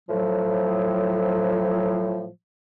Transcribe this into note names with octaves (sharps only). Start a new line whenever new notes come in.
A2 F3 F#3